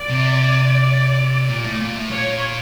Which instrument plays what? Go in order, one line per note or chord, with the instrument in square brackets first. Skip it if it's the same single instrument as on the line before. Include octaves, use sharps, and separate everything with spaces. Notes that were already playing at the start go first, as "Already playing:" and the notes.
Already playing: [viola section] D5
[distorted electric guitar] C3
A#2
A2
A#2
A2
[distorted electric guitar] A#2 [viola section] C#5